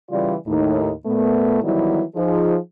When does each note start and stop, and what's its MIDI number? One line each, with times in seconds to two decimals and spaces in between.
0.10 0.34 49
0.10 0.34 52
0.10 0.34 55
0.10 0.34 65
0.10 0.34 74
0.47 0.91 39
0.47 0.91 45
0.47 0.91 63
1.06 1.61 46
1.06 1.61 57
1.06 1.61 59
1.63 2.02 51
1.63 2.02 52
1.63 2.02 54
1.63 2.02 55
1.63 2.02 59
1.63 2.02 64
2.15 2.57 53
2.15 2.57 63
2.15 2.57 68